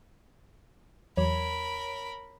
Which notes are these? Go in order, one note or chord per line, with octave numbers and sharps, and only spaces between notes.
E2 F#3 A#4 C#5 B5